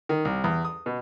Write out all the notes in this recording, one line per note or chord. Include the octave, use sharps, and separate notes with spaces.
D#3
C2
E2
D#6
B2